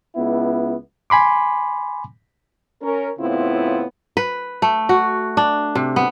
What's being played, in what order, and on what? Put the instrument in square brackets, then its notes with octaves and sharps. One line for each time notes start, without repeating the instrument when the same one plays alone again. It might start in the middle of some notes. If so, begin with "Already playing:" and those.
[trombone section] C#2 B3 E4
[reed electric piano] G#5 B5 C6 D6
[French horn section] C#4 A#4
A2 C#3 B3 C4 E4 F4
[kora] B4
A3
F#4
D4
C3
B3